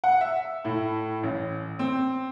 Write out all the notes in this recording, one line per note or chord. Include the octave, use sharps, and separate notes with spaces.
F#5
E5
A2
A1
C4